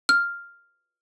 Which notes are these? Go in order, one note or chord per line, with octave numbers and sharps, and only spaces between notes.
F6